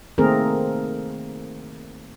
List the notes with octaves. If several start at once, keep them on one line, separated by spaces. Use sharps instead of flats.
D#3 A3 A#3 C4 G#4 A#4